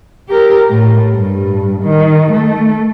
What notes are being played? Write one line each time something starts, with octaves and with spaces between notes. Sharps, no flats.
G4 A#4
A2
G2
D#3
A3